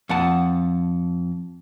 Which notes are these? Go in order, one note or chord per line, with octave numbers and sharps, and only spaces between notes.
F2 F#5 A5